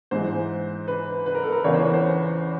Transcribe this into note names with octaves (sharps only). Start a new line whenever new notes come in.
G#2 E3 G#3 C5
B4
B4
A#4
A4
A#4
E2 C#3 E3 C#5
C5
B4
C5